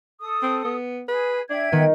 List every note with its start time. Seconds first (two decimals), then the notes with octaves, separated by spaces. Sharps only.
0.20 A4 D#6
0.43 C4
0.65 B3
1.08 G#4 B4
1.50 D4 E5 G5 G#6
1.72 D#3 B3